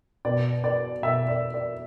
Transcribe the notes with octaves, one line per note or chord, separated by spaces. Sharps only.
B2 D5
D5
B2 E5
D5
D5